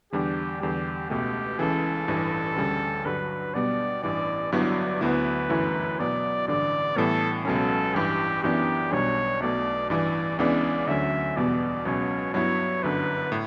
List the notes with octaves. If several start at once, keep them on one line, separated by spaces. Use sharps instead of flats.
E2 D3 G3 D4 G4
E2 D3 G3 G4
C#2 B2 A3 G4
C#2 C#3 E3 A4
A1 G2 E3
D2 C#3 G3
G2 D3 F#3 B4
B2 G3 B3 D5
A1 G2 E3 D5
G1 G2 F#3 B3 E4 D5
D2 D3 F#3 B3 E4 B4
G1 F#2 E3 A3 E4
B2 F#3 B3 E4 D5
A1 G2 D3 D5
A2 E3 G3 B3 A4
C#2 B2 F#3 C#4 A4
A1 G2 E3 G4
F#2 E3 B3 D4 G4
B1 B2 G3 D4 C#5
B1 B2 A3 D5
A1 G2 E3 D5
C#2 C#3 E3 B3 D4 D5
D2 D3 F#3 A3 C#4 E5
E2 B2 G3 B3 D5
C#2 B2 F#3 C#4 C#5
G2 F#3 B3 E4 C#5
G1 F#2 D3 B4
A2